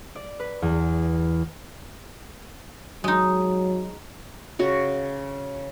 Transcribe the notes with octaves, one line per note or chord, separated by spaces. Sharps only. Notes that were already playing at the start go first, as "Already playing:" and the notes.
D5
B4
E2
F#3 G#3 D#4
C#3 F#4 C#5